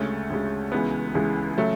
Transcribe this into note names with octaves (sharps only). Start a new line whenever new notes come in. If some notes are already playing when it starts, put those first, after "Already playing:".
Already playing: D2 C#3 G#3 A3 C#4
D2 C#3 G#3
C#2 C#3 E3 G#3 B3
C#2 C#3 E3 G#3
C#3 F#3 A3